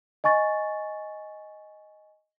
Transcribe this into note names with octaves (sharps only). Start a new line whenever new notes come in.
D#5 G#5 C#6 A6